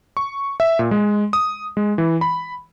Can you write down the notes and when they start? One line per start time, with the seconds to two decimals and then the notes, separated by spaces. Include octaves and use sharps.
0.17 C#6
0.60 E5
0.79 A#2
0.91 G#3
1.33 D#6
1.77 G#3
1.98 E3
2.21 B5